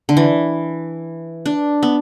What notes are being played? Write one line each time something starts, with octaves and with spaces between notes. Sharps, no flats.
D3
E3
D4
B3